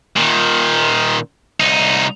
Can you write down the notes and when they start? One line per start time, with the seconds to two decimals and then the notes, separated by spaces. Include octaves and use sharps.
0.16 A#2 D#3
1.60 C2 D#4